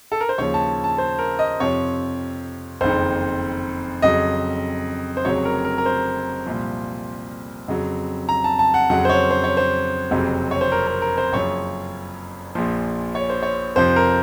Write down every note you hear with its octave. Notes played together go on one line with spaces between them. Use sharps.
A4
A#4
C5
D#2 C#3 F3 C#5
A5
A5
C5
A#4
D#5
F2 C3 F3 C#5
F#1 F2 D#3 C5
F2 C#3 F#3 D#5
C5
F1 F2 C#3 F#3 C#5
A#4
A#4
A#4
C5
C2 A#2 F3
F2 C#3 F#3
A#5
A5
A5
F#5
F2 C#3 F#3 F#5
C5
C#5
C5
C#5
C5
F#1 F2 C3 F#3
C#5
C5
A#4
A#4
A#4
C5
F#1 F#2 F3 C#5
A#1 A#2 F3
C#5
C5
C#5
F2 C3 F3 C5
A#4